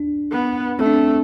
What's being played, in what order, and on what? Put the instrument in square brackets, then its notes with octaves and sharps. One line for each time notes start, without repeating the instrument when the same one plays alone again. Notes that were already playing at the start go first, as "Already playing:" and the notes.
Already playing: [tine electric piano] D4
[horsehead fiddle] B3
[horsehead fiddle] A3 [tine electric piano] C4
[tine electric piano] D4
C4